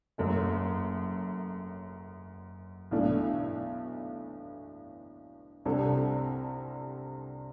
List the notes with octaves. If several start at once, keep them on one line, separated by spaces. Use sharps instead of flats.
F#1 F#2 F#3 A3
B1 A2 E3 A3 D4
C2 C3 G3 D4 A4